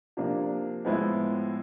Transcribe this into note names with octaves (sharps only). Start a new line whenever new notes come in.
C3 F3 A#3 D4
A2 F3 G#3 B3 E4